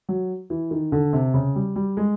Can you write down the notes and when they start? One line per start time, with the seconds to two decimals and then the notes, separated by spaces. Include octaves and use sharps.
0.09 F#3
0.50 E3
0.71 D#3
0.92 D3
1.13 C3
1.34 C#3
1.56 G3
1.76 G3
1.97 G#3